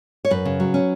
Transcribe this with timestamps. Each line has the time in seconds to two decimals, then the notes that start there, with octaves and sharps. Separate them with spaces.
0.25 C#5
0.31 F#2 B4
0.45 C#3
0.60 F#3
0.74 C#4